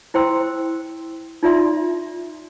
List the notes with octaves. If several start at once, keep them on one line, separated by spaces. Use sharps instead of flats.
E4 C5 G5 C6 E6
D#4 F4 D5 E5 C6